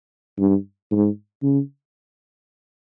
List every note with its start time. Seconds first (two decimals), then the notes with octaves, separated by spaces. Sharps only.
0.38 G2
0.91 G#2
1.43 C#3